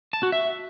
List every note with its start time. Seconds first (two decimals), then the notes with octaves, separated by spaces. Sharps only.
0.13 A5
0.23 F#4
0.32 E5